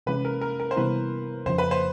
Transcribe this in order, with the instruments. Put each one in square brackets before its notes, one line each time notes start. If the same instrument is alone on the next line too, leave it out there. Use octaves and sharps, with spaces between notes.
[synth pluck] C3 E3 G#3 C#4 [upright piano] B4
[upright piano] A#4
A#4
A#4
C5
[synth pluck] C3 E3 G3 B3 E4 [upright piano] B4
[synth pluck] F2 C#3 F3 [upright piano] C5
[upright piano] B4
C5